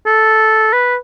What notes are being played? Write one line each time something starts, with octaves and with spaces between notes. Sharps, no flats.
A4
B4